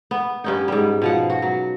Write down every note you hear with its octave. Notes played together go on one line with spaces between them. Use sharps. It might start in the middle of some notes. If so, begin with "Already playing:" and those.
B3
G2 C#4 D#4
G#2 G3
B2 F3 F#5
F#4
F#3